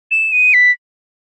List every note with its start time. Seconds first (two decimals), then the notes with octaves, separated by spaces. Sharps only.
0.11 E7
0.32 D#7
0.54 B6